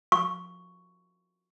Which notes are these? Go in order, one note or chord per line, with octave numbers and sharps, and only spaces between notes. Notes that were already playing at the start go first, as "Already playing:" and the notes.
C#6